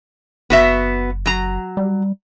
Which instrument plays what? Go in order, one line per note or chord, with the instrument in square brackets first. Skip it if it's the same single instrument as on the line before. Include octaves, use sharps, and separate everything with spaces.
[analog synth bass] F#1 [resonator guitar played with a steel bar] B3 F#4 E5
[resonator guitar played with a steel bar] F#3 A#5
[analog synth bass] G3